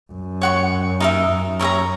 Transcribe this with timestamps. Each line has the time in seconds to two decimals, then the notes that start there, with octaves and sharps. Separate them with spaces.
0.12 F#2
0.41 C#5 F#5 C#6
1.00 D#4 A#4 E5
1.30 F#2
1.59 A#4 C#5 E5 A#5